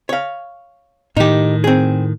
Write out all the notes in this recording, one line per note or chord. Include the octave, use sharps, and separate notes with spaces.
C#5 F5
A2 D#3 D#4 G4
C4 G#4